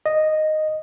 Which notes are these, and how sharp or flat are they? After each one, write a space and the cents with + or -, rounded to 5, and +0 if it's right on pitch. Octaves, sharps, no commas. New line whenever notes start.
D#5 -5